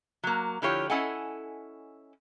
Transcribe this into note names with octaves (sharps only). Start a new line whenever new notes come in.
F#3 A#3
D3 F3 E4 F4 G4 C#5
C#4 E4 A4 D#5 F#5 G#5